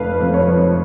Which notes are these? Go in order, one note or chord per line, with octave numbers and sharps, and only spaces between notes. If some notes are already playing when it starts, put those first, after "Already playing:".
Already playing: F1 F2 A3 B4 F5
F2
C#5
F3